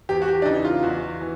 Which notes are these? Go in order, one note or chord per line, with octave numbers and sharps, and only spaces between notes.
E2 G4
F#4
G4
D4
C#3 E3 D#4
F4
E2 F#4
E3